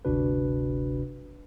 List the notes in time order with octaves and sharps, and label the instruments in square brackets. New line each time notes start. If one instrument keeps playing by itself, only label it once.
[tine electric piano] G1 D2 C3 D4 F#4 B4